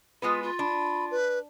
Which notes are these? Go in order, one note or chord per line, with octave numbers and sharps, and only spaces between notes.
G#3 B3 F4 B4
F4
D4 B5
B4